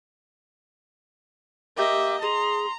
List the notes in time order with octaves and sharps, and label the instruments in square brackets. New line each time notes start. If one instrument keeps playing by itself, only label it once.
[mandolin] A#3 G4 G6 [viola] D#5 E5 [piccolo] D6
[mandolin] G#4 [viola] A#5 [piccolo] C6